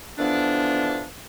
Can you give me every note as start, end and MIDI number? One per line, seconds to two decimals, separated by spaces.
0.19 1.05 50
0.19 1.05 52
0.19 1.05 53
0.19 1.05 59
0.19 1.05 62